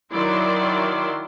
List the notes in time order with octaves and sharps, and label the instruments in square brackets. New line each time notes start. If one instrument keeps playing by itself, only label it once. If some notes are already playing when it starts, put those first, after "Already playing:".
[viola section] D#3 F#3 E4 D5 E5 C6